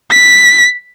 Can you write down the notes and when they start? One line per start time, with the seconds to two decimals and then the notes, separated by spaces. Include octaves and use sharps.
0.11 B6